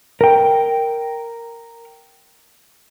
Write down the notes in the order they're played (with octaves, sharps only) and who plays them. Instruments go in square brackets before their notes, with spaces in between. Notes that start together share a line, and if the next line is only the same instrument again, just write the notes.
[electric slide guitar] A#4 G5